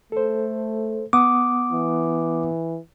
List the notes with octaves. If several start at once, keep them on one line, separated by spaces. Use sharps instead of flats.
A3 A4 C5
B3 F#5 D6 D#6
E3